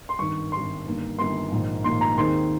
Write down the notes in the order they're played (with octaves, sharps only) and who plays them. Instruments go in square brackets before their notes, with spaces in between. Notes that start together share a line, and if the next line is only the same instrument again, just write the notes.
[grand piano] C6
G#1 G2 D#3 C#6
G#1 G2 D#3 C6
G1 G2 D#3 A#3
G1 G2 D#3 A#3 C6
A#1 G#2 D#3 A#3
A#1 G#2 D#3 A#3 C6
A#5
D#2 D#3 G#3 C4 D#4 C6